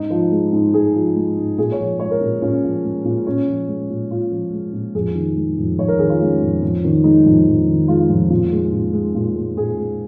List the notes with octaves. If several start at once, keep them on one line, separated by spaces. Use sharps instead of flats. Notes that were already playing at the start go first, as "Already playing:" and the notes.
Already playing: G#2 D#4
F3
G#3
G#2
G#2 G#4
F3
G#3
G#2
A#2 G#4
C#5
F3
G#3 C#5
A#4
A#2
A#2 C#4
F3
G#3
A#2
A#2 C#4
F3
G#3
A#2
A#2 F4
F3
G#3
A#2
F2 G#4
D#3
G#3
F2
F2 C#5
A#4
D#3 G#4
F4
G#3 C#4
F2
F2
D#3
G#3 D#4
F2
F2
D#3
G#3 F4
F2
A#2
G#3
A#2
G#3
A#2
G#3
A#2 G#4
G#3